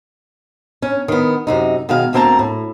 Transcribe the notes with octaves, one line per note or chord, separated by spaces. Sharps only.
C#4
D#3 B3
F#2 C3 D#4
B2 D#3 G#3 F5
D2 A#3 C4 G5 A5 A#5
A2